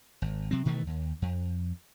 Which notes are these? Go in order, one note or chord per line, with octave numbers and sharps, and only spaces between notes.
G#1
C3 F#3 C4
B2 D#3 E3 A3
D#2
F2